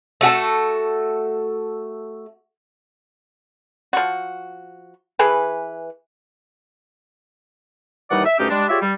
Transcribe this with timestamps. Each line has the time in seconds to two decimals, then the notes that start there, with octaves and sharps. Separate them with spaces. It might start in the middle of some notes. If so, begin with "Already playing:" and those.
0.21 A3 F#4 G#4 A4
3.93 F3 F#4
5.19 E3 G#4 B4
8.11 D#2 E3 G3 D#4 D5 F#5
8.26 E5
8.39 D2 G2 A3 C#4 D#4 G4
8.50 G3 G#3 D4
8.69 F4 G4 G#4 C#5 D5 E5
8.82 G3